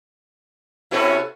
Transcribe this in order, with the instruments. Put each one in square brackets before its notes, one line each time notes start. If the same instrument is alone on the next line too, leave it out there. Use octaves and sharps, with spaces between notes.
[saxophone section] C3 C#4 [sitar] E4 F#4 A4